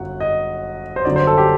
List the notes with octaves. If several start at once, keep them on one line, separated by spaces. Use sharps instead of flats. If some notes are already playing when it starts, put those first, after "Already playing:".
Already playing: G1 F#2 F#3 F#5
D#5
C5
G1 F#2 D3 F#3 D5
C5
A4
G4